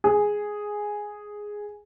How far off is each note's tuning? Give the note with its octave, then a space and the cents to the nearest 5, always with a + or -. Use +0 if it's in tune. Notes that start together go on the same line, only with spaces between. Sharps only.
G#4 +0